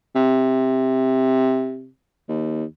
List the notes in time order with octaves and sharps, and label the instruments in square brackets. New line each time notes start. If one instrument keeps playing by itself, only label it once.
[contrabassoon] C3
D#2